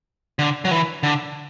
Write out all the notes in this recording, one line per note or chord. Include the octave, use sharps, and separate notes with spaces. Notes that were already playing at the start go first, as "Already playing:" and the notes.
D3
F#3
E3
D3